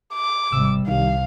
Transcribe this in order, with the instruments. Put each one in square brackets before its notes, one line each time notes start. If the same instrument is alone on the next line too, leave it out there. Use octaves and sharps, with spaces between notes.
[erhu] D6
[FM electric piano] G#1 E6 [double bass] C3 G3
[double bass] C2 [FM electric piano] D#3 G3 [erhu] F5